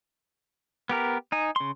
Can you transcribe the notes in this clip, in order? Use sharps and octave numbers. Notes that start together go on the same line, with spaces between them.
B3 G4 A#4
D#4 G#5
C#3 C6